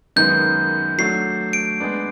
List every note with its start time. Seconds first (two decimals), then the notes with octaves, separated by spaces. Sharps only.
0.16 F#2 D#3 G#3 B3 D#4 G6
0.98 F#3 A3 D4 F#4 C7
1.53 D7
1.80 G#3 B3 D4